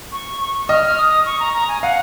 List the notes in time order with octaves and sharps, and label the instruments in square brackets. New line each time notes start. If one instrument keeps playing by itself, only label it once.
[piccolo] C#6
C#6
[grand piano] D#5 [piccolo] F6
[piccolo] D#6
C#6
A#5
A#5
G#5
[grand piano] F5 [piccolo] F#5